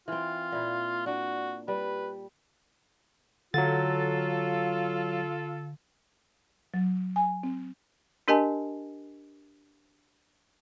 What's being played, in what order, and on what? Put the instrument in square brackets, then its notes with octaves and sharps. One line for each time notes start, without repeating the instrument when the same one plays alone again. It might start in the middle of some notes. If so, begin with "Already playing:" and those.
[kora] E3 C4 [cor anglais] F4
[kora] A#2 E4
[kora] D4 [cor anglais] F#4
[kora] G3 [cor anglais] B4
[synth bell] D3 [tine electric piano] F#3 A6 [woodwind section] F4 A4
[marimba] F#3
G#5
C4
[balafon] D4 G4 A#4 D#5 G#5 A5